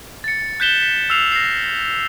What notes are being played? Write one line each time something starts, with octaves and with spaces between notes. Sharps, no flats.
A6 C#7
F#6 G6 B6 E7 G7
B6
E6 F6 C7 F7
A#6 C7